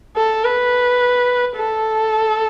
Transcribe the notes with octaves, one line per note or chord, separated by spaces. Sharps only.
A4
B4
A4